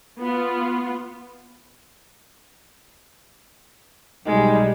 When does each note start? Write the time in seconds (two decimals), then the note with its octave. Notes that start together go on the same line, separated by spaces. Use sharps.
0.19 B3 F4
4.26 B1 G3 G#3 D#4